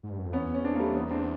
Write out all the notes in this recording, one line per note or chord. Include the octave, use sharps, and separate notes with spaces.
G#2
G2
F#2
F2
E2 B3 C#4
C#4
C4 D4
A#3
G3 A3
B3 C#4
C4 D4